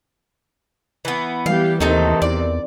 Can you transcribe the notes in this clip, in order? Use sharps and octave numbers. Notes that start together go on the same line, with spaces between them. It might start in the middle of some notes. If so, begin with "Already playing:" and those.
E3 B3
E3 G3 B3 G4 F5
D#2 C3 D#3 E3 A3 D#4 A4
E2 D5